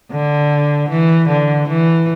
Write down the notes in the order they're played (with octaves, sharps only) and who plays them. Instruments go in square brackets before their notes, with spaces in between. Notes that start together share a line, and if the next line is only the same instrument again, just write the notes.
[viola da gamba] D3
E3
D3
E3